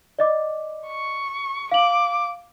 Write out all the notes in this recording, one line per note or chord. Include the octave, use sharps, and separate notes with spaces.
D5 D#5 D6
C#6
F5 D6 F#7